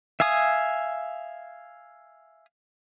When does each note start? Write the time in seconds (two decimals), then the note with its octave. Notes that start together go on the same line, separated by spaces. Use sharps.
0.20 E5 F5 G#5 D#6